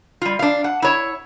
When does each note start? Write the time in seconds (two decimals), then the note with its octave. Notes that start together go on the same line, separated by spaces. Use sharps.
0.22 G3 F4
0.39 D4 F5
0.64 F#5
0.82 E4 C#5